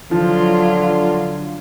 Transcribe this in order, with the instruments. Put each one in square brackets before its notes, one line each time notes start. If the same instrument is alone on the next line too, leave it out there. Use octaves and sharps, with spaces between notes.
[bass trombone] D3 [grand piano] F3 [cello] F#3 F4